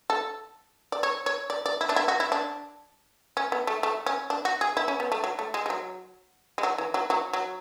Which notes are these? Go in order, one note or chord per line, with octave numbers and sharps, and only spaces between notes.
A4
D5
C#5
C#5
D5
D5
E4
D4
E4
F#4
E4
D4
C#4
B3
A3
A3
C#4
D4
F#4
G#4
E4
C#4
B3
A3
F#3
A3
G#3
G#3
F#3
G#3
F#3
E3
F#3
F#3
F#3